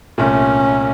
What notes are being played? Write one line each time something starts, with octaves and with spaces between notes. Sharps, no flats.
C2 A#2 A3 C#4